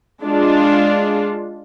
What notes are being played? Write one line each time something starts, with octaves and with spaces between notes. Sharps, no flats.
G#3 D4 F4